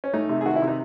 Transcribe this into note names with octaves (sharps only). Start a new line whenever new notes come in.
C#4
A3 D#4
C3
G#4
D#3 F#4
E4
C3
D#4